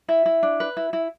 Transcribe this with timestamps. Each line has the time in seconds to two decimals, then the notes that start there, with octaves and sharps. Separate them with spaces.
0.08 E4 E5
0.26 E4
0.43 D4
0.60 B4
0.77 E4
0.93 E4